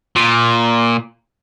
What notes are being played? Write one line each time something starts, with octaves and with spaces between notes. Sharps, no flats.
A#2